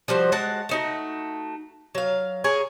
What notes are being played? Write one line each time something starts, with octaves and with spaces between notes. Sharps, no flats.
F3 G3 F#4 C5
G#3 F#4 F#5 A5
A3 D#4 F#4
F#3 F5
G#4 A#4 C#5